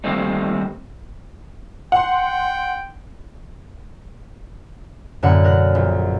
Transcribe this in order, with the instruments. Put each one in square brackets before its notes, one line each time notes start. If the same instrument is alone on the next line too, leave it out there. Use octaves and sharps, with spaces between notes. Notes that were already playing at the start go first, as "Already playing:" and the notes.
[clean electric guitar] D#3 G3 A3 A#3 C4 D#4
[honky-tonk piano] F#5 C6 [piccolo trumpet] G5
[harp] F#2 A2 D3 A#3 F#5
B2 A#4 F#6
A#1